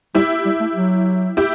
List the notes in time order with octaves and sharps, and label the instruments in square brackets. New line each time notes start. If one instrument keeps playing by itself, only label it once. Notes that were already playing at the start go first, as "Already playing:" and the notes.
[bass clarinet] G3 [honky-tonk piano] E4 G4
[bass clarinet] G3
A3
F#3
[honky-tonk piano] E4 G4